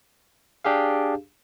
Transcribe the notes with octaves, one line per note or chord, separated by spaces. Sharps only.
D4 G4 G#4 F5